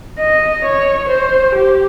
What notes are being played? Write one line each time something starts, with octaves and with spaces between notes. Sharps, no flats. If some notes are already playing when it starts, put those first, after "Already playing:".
D#5
C#5
C5
G4